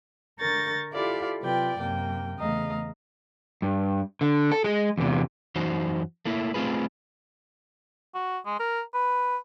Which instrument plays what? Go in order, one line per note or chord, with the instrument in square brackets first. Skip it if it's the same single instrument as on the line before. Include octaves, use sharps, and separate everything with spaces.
[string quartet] D3 A#4 C#6 G6 A6 A#6
E4 F4 G4 A4 D5 F5
C3 F#3 F4 B4 D5 G5
F#2 C3 F#3 A#3 G5
E2 C#3 A3 D#5 F5 A#5
[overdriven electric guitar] G2
D3
A4
G#3 G#4
E2 C3
[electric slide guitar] F#2 E3 D#4 F#4 C5
A3 A#3 E4
A3 C4 F4 G#4 B4
[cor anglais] F#4
G#3
A#4
B4